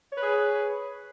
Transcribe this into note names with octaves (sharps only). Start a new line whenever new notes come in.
G#4 B4 C#5